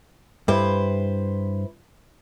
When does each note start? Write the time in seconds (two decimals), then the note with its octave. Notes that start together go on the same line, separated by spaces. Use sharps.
0.48 G2 E4 B4 C5